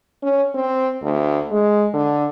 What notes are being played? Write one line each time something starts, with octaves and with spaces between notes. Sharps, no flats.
C#4
C4
D2
G#3
D3